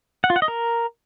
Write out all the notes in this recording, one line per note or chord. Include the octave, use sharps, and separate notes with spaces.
F#5
F4
F#5
D#5
A#4